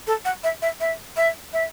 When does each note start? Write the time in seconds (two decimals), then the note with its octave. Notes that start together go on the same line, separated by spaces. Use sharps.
0.07 A4
0.25 F#5
0.44 E5
0.62 E5
0.81 E5
1.17 E5
1.53 E5